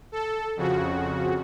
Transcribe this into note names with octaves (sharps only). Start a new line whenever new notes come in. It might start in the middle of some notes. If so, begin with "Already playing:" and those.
A4
F2 C#3 F#4